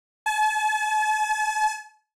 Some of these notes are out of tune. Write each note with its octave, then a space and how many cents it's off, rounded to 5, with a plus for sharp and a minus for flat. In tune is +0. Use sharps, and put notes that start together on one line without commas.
A5 -45